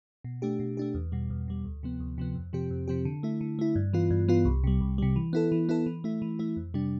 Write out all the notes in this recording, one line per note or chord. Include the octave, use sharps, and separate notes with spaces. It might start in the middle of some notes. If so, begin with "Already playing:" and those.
B2
A3 D4 G4
B2
A3 D4 G4
E2
B2 G3
E2
B2 G3
D2
C3 F3 B3
D2
C3 F3 B3
F2
C3 F3 C4 G4
F2
C3 F3 C4 G4
D3
A3 E4
D3
A3 E4
G2
E3 B3 F4
G2
E3 B3 F4
C2
C3 G3
C2
C3 G3
E3
B3 E4 A4
E3
B3 E4 A4
E3
A3 E4
E3
A3 E4
F2
C3 G3 D4